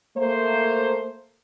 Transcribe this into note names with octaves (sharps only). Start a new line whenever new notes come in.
A3 A#3 C5